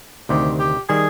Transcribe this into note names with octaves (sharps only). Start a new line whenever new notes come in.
D2 C3 D#3 G4
G4
D#3 G3 G#4